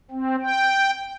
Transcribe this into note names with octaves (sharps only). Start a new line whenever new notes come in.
C4
G5